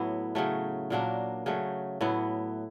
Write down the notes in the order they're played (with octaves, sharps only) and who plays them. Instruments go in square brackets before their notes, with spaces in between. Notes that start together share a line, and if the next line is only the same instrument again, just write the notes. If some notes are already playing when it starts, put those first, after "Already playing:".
Already playing: [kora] A2 F#3 B3 E4
C#3 F#3 A3
A#2 F#3 A#3 D4
C#3 F#3 A3
A2 F#3 B3 E4